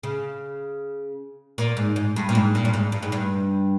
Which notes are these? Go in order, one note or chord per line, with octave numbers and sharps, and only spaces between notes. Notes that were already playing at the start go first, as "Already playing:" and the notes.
C#3
A#2
G#2
G#2
G2
A#2
G#2
A#2
G2
G#2
G2
G#2
G2